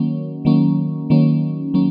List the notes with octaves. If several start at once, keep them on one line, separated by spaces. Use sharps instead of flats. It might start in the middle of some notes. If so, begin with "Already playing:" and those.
Already playing: D#3 F#3 A#3 C#4
D#3 F#3 A#3 C#4
D#3 F#3 A#3 C#4
D#3 F#3 A#3 C#4